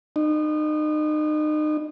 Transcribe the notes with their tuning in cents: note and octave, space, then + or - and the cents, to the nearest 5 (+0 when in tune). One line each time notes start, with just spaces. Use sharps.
D#4 -35